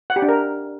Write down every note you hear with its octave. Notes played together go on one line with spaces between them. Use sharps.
F#5
G4
D4
A#4